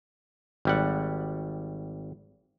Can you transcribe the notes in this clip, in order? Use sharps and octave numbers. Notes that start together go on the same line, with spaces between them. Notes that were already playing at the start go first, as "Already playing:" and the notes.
G#1 G3 F#5